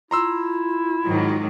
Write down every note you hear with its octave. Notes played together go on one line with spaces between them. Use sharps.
E4 F4 A#5 C6 E6
G#2 D#3 F#3